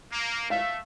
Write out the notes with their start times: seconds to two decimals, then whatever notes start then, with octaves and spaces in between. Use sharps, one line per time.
0.11 A#3
0.50 A3 E5 F5